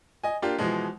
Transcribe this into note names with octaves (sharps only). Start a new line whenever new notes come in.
D#5 G#5
A#3 D4 F4 G4
B2 E3 F3 G#3